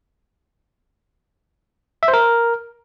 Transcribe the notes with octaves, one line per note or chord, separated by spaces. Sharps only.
E5
C5
A#4